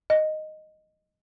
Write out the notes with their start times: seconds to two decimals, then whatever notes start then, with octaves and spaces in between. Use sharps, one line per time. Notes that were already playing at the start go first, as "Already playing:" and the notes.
0.10 D#5